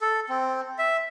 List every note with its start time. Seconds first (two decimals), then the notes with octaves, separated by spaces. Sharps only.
0.01 A4
0.29 C4
0.79 E5